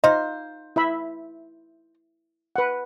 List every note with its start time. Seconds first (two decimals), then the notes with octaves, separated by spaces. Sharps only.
0.04 D#4 F4 C5 D#5
0.76 E4 E5 B5
2.56 B4 F#5